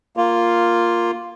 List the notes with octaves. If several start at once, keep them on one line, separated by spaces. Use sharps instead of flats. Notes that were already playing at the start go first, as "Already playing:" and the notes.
A#3 F4